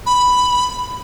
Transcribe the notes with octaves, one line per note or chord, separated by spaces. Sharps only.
B5